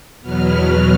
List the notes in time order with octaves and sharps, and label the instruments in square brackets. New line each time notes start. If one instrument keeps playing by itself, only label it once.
[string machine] E2 B2 F#3 B3 F6